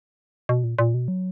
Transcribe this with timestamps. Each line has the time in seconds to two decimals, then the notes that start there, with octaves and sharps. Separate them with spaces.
0.49 B2
0.64 A#2
0.79 A#2
0.94 B2
1.08 F#3